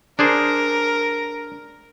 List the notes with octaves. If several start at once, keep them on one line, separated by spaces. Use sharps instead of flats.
D4 G#4 A#4 C5